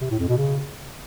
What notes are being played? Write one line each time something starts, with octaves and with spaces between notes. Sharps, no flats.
C3
A2
F2
B2
C#3